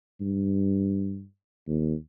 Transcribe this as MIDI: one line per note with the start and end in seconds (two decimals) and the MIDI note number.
0.21 1.24 43
1.68 1.94 39